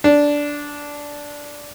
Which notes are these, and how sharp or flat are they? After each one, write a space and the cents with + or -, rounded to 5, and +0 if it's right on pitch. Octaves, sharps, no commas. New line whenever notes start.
D4 -10